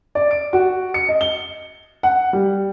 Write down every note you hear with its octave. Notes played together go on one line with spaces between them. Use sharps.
D5
D7
F#4
C#7
D#5
G7
F#5
G3